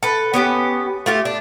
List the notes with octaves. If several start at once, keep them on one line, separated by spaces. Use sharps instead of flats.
A4 B4
B3 C#4 G4
A3 F4 G4
D4